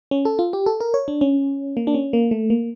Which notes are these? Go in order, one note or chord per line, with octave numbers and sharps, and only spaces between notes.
C#4
A4
F4
G4
A4
A#4
C#5
D4
C#4
A#3
D4
C#4
A#3
A3
A#3